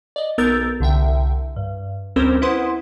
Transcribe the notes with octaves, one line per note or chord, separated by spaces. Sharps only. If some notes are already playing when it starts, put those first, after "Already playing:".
D5 D#5
B1 B3 A#4 E6 G6 A6
C2 D3 E5 G5
G2
D2 G3 C4 C#4 A#4 C5
E4 B4 C5 F#5 C6 D#6